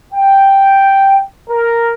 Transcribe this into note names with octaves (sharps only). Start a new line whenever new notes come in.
G5
A#4